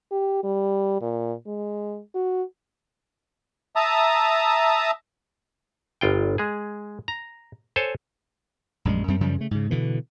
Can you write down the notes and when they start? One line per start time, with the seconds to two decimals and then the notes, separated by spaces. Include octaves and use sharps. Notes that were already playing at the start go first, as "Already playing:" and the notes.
0.11 G4
0.44 G3
1.02 A#2
1.46 G#3
2.15 F#4
3.76 E5 A5 A#5 D#6
6.01 G1 F4 G5
6.38 G#3 G#4
7.08 A#5
7.76 A4 C5 C#5 G#5 A5
8.85 A#1 F#2 G3 G#3
9.08 F#2 G3 C4
9.21 F#2 C#3 F3 G3
9.38 C#3 A3
9.51 G#2 C#3
9.71 B2 D3 E3